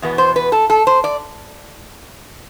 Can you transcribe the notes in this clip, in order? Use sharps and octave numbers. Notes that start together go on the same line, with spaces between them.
E2 B2 B3
C5
B4
A4
A4
C5
D5